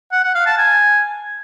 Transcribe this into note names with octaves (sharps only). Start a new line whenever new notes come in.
F#5
F#5
F5
A5
G#5